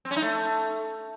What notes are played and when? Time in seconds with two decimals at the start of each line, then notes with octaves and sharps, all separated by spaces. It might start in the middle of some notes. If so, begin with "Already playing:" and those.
0.05 C4
0.11 C#4
0.16 D#4
0.22 A3